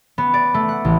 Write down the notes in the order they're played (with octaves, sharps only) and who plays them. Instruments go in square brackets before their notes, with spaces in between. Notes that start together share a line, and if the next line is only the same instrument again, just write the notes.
[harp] B3
D5
A3
F#5
A1